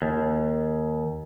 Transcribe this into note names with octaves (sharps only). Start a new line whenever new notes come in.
D#2